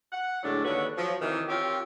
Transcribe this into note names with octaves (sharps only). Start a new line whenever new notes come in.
F#5
A2 D3 F#3 G#3 D4
D#2 D3 F#4 B4 C#5
F3 F#3
C3 D#3 E3
C4 F4 G4 A#4 C#5